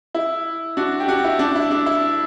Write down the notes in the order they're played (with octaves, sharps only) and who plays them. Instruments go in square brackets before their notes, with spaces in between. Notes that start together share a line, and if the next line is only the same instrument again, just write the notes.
[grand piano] E4
D4 F#4
G4
D4 F#4
E4
D4
E4
D4
E4